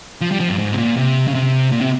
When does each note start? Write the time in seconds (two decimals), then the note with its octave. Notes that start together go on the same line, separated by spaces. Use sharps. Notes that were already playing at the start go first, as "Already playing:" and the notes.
0.21 F3
0.31 G3
0.40 F3
0.49 G2
0.58 G#2
0.72 C3
0.78 A#2
0.97 C3
1.28 C#3
1.34 C3
1.72 A#2
1.81 C3